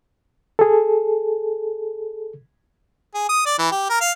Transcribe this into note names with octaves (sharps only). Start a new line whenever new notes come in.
G#4 A4
G#4
D#6
D5
E3
G4
A#4
F5